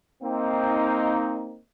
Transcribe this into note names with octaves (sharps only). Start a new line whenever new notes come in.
A#3 C4 D#4